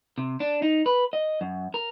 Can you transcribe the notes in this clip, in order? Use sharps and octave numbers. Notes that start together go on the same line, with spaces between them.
C3
D4
D#4
B4
D#5
F#2
A#4